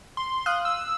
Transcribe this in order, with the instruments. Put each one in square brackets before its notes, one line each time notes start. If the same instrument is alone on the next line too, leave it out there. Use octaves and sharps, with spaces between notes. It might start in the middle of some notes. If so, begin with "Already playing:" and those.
[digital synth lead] C6
[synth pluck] F5 D#6 F#6
[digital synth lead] E6